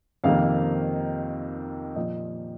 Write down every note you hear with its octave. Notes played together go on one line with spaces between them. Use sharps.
F2 C3 D#3 A#3 F5
A#2 F3 D#5